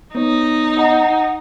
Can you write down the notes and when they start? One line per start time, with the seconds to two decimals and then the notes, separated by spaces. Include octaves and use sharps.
0.15 B3 D#4 C#5
0.77 D#5 F#5 A#5